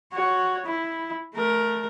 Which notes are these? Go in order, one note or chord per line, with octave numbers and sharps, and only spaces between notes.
F#4 C#5
E4
A3 A#4